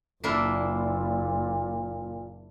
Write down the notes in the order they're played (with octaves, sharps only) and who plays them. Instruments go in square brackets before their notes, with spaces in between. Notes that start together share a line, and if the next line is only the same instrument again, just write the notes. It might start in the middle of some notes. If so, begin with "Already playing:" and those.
[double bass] F#1 [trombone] A#2 [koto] A#3 D4 E4